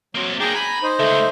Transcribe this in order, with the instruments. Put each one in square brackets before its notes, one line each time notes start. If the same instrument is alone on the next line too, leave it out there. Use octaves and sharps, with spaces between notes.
[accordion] F#3 [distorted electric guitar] A#3 C4
[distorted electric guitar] A#3 D4 [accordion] G#4 G5 A#5
[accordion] G#5 A#5 [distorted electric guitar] B5
[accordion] D#4 C5
[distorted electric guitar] C#2 D3 [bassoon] A3